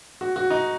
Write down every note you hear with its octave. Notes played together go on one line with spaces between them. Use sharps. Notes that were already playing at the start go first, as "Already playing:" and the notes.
F#4
F#4
D#4